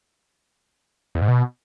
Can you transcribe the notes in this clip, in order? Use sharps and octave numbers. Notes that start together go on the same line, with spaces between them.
E2
G#2
B2